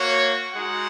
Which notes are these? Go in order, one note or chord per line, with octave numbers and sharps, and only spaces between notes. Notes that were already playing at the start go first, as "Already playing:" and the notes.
Already playing: A#3 F#4 C#5
G#3 D#4 F#4 F#5